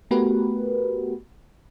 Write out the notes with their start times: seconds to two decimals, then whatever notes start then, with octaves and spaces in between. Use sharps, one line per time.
0.11 A3 B3 F#4 G4 A#4 B4